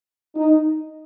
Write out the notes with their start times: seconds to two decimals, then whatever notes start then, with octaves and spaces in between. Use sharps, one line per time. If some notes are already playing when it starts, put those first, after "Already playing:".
0.36 D#4